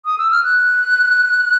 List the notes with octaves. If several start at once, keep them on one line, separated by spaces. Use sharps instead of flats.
D#6
E6
F6
F#6